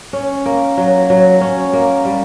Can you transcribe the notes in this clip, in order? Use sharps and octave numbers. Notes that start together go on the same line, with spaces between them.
C#4
A#3
F#3
F#3
C#4
A#3
G3